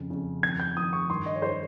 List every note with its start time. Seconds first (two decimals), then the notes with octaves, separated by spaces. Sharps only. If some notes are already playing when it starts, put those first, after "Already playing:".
Already playing: F2 C#3
0.10 F2 C#3
0.42 F2 D#3 G#6
0.60 G6
0.77 F2 D#3 D#6
0.93 C#6
1.10 G2 D#3 C6
1.26 D#5
1.36 C#5
1.42 D#3 C5